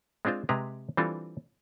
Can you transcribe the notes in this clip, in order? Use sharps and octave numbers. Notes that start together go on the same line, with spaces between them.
G#3 C4 D4 F4 C5
C3 G#3 G4 G#4 B4 A#5
E3 G3 C4 D4 F4 A4